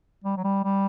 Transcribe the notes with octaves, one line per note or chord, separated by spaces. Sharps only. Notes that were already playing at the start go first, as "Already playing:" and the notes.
G3
F#3
G3
G3